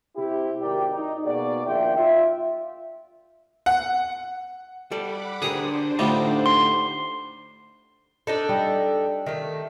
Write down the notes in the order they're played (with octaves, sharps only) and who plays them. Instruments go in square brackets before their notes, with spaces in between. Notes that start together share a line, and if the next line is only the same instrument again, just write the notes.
[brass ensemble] C3 C4 E4 G4
G#1 A#4 D5 G5
D#4
B2 A#3 F#4 G#4 D5
A#1 D#2 F4 D5 E5 G5
F4 E5
[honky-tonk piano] F#5
[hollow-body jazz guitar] G3 A4 D5 [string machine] F#5 B5 D6
[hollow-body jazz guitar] D3 G4 A#4 [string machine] D4 C5 [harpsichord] G#4 D#6
[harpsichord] A2 D3 G3 [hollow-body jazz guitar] D#4 F4 D5
[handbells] C6 C7
[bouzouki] D4 D#4 A4
[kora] G3 D#5
[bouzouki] D#3 A3